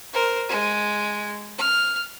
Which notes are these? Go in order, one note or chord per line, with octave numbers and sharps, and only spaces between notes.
A#4 C5
G#3
F6